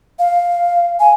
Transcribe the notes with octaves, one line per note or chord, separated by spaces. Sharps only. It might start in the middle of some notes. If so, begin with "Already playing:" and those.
F5
G#5